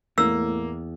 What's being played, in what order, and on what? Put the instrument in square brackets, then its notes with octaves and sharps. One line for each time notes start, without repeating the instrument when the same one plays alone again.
[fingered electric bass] E2 [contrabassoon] A2 [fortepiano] A#3 [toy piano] E6